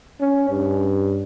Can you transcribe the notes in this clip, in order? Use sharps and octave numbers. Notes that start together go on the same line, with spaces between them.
C#4
G2